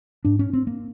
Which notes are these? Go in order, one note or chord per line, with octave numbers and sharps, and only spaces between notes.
G#2 D4
C#4
C4
A#3